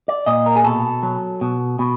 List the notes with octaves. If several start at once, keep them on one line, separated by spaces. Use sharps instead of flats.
D5
A#2 D#5
A#4
G#4
B2 A4
F#3
B2
B2